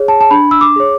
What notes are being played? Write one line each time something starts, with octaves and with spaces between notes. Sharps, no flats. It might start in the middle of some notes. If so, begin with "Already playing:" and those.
Already playing: G#4 C#5
A5
A5
D4 B5
E6
D6
G#4 C#5